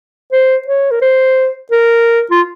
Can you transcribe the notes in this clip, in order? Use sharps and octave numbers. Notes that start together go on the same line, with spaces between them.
C5
C#5
A#4
C5
A#4
F4